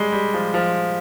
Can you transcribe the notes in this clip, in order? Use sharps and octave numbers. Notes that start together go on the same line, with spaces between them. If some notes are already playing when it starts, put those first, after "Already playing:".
Already playing: G3 G#3
G3
F3
F3